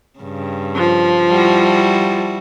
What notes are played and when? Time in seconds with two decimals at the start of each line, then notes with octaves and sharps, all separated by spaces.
0.19 G2 C#3
0.75 F3
1.30 G3 E4 F#4